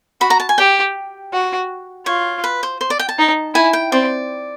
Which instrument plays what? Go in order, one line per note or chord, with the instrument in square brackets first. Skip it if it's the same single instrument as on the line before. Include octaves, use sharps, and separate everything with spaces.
[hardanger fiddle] F#4 [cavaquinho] B5
[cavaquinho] A#5
A5
G#5
[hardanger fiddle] G4 [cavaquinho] G5
[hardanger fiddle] F#4
[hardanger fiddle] F4 [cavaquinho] C#5
[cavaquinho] B4
C5
C5
D5
G5
A5
[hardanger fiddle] D#4
[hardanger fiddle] E4 [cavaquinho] G#5
[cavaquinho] G5
[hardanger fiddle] C4 [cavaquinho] D5